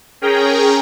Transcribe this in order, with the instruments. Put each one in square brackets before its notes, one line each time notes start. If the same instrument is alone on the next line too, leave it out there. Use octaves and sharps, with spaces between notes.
[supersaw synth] C#4 G#4 A#4 G5 A#5